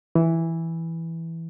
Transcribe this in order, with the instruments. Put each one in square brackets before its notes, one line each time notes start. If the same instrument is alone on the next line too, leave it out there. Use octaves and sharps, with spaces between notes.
[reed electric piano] E3